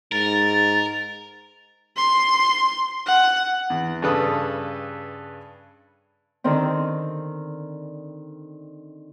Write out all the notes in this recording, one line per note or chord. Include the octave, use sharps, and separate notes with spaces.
G#2 A#4 A6
C6
F#5
E2
G2 C#3 A4 B4 D#6
D3 D#3 C4